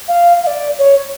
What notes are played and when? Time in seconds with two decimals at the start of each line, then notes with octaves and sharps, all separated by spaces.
0.08 F5
0.43 F5
0.47 D5
0.79 C#5